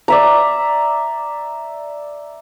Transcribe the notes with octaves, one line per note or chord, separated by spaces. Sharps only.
D5 E5 A#5